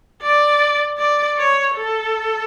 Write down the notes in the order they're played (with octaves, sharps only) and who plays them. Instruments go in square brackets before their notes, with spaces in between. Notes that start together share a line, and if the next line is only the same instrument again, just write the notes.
[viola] D5
D5
C#5
A4